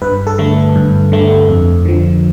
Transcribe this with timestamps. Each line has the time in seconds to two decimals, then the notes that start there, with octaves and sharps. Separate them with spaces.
0.02 G2 B4
0.27 A4
0.38 D3 A3
0.75 G2
1.12 D3 A3
1.49 F2
1.85 D3 F3